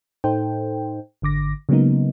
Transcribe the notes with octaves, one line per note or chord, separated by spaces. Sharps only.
A2 D#4 A4 C5 G5
G#1 D3 D6 A#6
C#3 F#3 G#3 A#3 B3 D#4